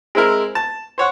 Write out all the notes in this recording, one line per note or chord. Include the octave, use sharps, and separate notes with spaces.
G#3 C4 E4 A#4
A5
C5 C#5 F#5